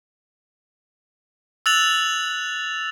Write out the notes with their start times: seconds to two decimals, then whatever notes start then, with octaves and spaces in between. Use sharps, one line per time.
1.66 E6 F#6 A6 F7 F#7